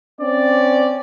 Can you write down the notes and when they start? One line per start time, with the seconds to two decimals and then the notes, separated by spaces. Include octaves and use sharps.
0.20 C4 C#4 D5